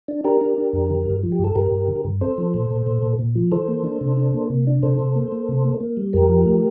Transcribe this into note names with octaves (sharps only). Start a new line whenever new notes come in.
D4
D4 G4 A#4
D4
D4
F2
D3
G2
F3
G4
G2
A4
G2 G4 A#4
G2
D3
G2
C4 A4 C5
F3
A#2
A#2
A#2
A#2
A#2
F3
E3 A4 C5
A#3
D4
C3
D4
A#3
C3
D4
C3 A4 C5
C3
A#3
A#3
C3
A#3
A#3
G3
F2 G4 A#4
F3
A3